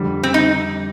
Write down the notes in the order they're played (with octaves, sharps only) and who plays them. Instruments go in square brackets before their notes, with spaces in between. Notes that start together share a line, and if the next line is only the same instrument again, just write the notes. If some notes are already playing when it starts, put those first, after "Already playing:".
Already playing: [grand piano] F2 D3 G3
[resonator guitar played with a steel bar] C4
D#4